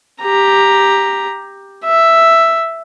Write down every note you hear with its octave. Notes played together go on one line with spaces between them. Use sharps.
G4 A#5
E5